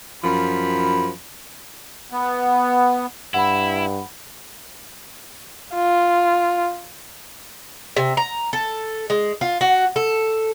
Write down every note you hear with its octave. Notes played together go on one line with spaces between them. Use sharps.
F#2 F3 B5
B3
G2 E4 F#5 B5
F4
C3
A#5
A4
G#3
F4
F#4
A4